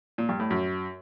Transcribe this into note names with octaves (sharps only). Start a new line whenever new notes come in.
A#2
G2
A2
F#2